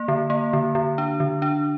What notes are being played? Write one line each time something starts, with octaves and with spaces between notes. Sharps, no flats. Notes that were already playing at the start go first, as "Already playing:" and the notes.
Already playing: A#3
D3
A#3
D3
D3
D4
D3
D4